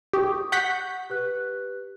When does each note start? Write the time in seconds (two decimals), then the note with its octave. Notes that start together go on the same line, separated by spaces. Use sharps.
0.13 G4 C#6 D#6
0.52 F#5 C#6 G6 B6
1.10 G4 B4 F#6